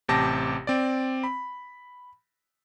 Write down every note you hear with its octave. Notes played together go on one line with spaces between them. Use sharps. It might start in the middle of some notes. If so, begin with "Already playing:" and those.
A1 C3 G4 A5 D6 A#6
C4 D5
B5